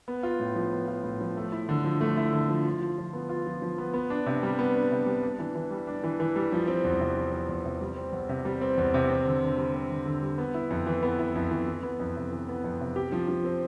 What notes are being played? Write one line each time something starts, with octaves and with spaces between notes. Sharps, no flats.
B3
F4
A2
F3
B3
F4
A2
F3
A3
E4
D3
F3
A3
E4
D3
F3
F4
F3
F3
B3
F4
F3
F3
B3
B3
D4
C3
G3
B3
D4
C3
G3
D4
E3
E3
G3
D4
E3
E3
G3
F3
C4
E2
C3
F3
C4
E2
C3
G3
C4
E2
C3
G3
C4
E2
C3
C4
D3
D3
G3
C4
D3
D3
G3
B3
E4
F2
E3
B3
E4
F2
E3
E3
B3
F2
C3
E3
B3
F2
C3
G4
F3
F3
C4